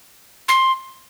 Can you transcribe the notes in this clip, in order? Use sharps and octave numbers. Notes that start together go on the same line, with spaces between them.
C6